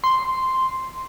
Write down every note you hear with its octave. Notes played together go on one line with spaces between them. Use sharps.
C6